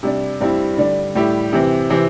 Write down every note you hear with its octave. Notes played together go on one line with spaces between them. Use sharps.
C3 G3 D4
G2 G3 C4 E4
D3 G3 D4
A2 G3 E4 G4
C3 E3 C4
C3 E3 C4